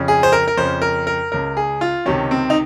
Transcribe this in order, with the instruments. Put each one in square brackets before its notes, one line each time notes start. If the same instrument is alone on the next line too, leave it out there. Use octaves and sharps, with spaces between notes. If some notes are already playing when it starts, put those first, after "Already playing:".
Already playing: [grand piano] F2 C#3
G#4
C5
A#4
A#4
F2 C#3 C5
A#4
A#4
C#2 C#3 A#4
G#4
F4
C#2 C3 D#3 C#4
C4
D#4